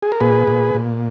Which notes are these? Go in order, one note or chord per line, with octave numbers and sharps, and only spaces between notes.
G#4
A#4
A#2 G#4 B4
A#2
A#2